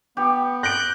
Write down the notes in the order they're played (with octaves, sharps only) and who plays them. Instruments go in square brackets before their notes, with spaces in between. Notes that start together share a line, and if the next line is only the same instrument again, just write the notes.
[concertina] B3 [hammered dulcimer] G4
[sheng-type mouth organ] F#6 G6 [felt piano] A#6 D7